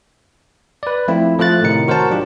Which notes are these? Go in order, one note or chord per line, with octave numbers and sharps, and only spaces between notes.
B4 D5
F3 A3 C4 E4 F4
F3 A3 F4 F#6 A6
A2 C3 D#3 D#4 C#7
F#4 A#4 C5 C#5 F#5 A5
F#3 D4 F4 G4